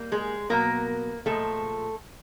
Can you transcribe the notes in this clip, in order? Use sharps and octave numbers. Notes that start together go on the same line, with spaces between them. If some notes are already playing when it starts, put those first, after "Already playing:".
Already playing: G3 A#3
G#3 G#4
B2 F#3 A#3 B3 A#4
A#2 F3 G#3 A3 A4